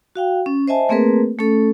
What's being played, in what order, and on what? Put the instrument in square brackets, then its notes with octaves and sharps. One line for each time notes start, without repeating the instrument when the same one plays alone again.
[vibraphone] F#4 F5 G5
C#4
C5 D#5 E5 G#5 A5
A3 A#3 C4 G#4 A#4 B4
A3 C#4 A4